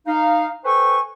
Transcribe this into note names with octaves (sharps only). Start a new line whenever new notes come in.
D#4 F5
A4 B4 C5 G5 G#5 C#6